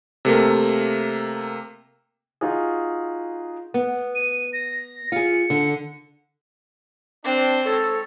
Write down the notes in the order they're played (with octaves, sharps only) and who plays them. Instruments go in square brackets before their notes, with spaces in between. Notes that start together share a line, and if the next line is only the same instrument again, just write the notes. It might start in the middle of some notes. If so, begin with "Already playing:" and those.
[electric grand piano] C3 A3 A#3
[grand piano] D#4 F4 F#4 G#4
[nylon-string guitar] B3
[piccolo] D#7
A#6
[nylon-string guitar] F4 G#4 [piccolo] C#7
[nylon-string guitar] D3
[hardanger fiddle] C4 [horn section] D4
[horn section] G#2 C#5 [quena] A4